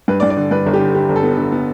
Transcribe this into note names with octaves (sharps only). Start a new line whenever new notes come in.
G2 B4
D5
G2
D5
D3
G2 B4
G1
G4
D3
D3 G4
G1
A4
B3
D3
B3